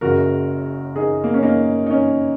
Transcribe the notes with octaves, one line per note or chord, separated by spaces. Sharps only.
F#1 F#2 C#3 F#4 A#4
D#4 G#4
A#3
C#4
A#3 D#4
D#4
C#4